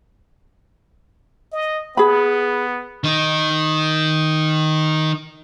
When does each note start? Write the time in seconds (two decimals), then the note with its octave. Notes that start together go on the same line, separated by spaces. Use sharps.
1.52 D#5
1.97 B3 G#4 B5
3.04 D#3 D#4